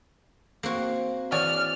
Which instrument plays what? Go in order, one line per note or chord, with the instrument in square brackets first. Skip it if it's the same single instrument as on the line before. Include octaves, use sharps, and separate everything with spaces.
[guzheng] A#3 C4 F#4
[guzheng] E3 [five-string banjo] G#4 C#5 D5 [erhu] F6